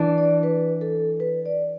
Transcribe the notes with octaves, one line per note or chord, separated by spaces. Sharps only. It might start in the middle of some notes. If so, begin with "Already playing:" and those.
Already playing: E3 D4
D5
B4
A4
B4
D5